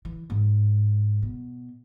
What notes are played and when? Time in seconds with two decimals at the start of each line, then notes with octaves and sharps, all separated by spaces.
0.05 E3
0.30 G#2
1.23 B2